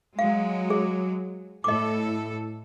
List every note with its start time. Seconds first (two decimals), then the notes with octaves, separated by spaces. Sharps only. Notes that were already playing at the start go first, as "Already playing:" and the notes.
0.19 F#3 G#3 F5
0.70 G#4
1.64 A2 A4 D#5 D6